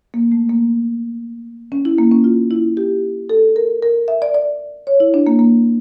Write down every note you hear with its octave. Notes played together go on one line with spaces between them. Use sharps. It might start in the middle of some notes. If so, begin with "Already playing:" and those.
A#3
A3
A#3
C#4
E4
A#3
C#4
F4
E4
G4
A4
A#4
A#4
E5
D5
D5
C#5
E4
D4
A#3
A#3